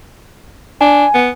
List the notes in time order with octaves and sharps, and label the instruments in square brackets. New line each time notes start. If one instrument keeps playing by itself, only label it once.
[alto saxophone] D4 [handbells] G#5
[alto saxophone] B3